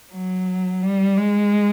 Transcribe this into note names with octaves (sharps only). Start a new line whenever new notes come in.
F#3
G3
G#3